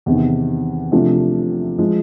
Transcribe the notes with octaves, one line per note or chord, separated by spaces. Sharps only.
E2 C3 D#3
C3 F3 A3 D4
F3 G#3